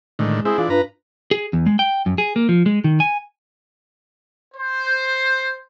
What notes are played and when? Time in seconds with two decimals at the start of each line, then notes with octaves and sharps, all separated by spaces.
0.19 A2 D3 D#3 G#3
0.45 C4 E4 G#4
0.58 E3 D4 F4
0.70 G2 B4 A#5
1.31 G#4
1.53 E2
1.66 G#3
1.79 G5
2.06 F#2
2.18 G#4
2.36 A#3
2.49 F3
2.66 G#3
2.84 D#3
3.00 G#5
4.55 C5